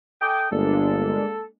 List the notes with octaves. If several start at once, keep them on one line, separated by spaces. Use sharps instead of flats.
A4 D#5 G5 G#5 D6 D#6
G1 G#3 A#3 D4 A4